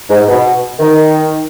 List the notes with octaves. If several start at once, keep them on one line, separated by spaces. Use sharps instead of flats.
G#2
B2
D#3